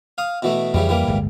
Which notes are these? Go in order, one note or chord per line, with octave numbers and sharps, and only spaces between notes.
F5 D#6
B2 E3 A3
F2 C#3 E3 G3
E3 G3 A#3
D1 G1 G#3